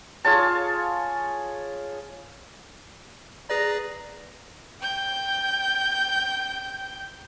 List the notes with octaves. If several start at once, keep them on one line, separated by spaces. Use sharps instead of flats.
F4 G#4 C#5 A5
G#4 B4 D5 A#5
G5 G6